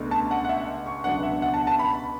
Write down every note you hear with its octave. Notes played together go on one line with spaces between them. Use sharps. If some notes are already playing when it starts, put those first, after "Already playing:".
Already playing: C#2 B2 A3 D4
A5
F#5
F#5
E5
C#6
C#2 B2 F#3 B3 D4 F#5
E5
F#5
A5
A5
B5